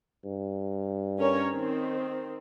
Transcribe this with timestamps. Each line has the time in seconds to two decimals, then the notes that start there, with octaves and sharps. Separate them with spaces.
0.25 G2
1.18 C#4 A#4 C#5
1.50 D#3 C4